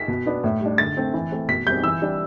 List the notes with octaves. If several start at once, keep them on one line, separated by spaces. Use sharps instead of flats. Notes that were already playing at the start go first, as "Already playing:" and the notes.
Already playing: B6
B2
B3 D4
A2
G3 D4
D3 A6
A3 C4
E3
A3 C4
B2 B6
G3 C4 G6
E3 E6
G3 D4